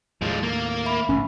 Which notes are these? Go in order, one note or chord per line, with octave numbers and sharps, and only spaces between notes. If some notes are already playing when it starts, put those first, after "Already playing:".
D#2 A2 F3 G#3
A#3
E5 B5
A1 G#2 C#3 C#4